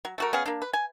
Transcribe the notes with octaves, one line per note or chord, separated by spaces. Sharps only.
F#3
A3 F#4 A#4
B3 C#4 G#4 F5
A#3 D4
B4
G#5